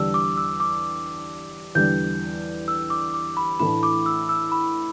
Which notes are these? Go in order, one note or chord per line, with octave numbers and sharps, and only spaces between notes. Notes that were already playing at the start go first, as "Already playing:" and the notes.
Already playing: E2 D3 G3 D4 G4 E6
D6
E6
D6
E2 D3 G3 G6
E6
D6
D6
B5
A2 E3 A3 D4 B5
D6
E6
E6
B5